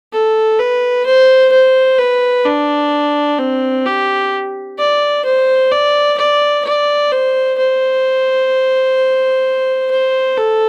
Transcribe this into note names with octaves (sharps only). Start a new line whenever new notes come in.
A4
B4
C5
C5
B4
D4
C4
G4
D5
C5
D5
D5
D5
C5
C5
C5
A4